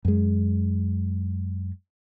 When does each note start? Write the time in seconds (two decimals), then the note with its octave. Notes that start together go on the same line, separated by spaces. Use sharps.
0.05 F#2 G#3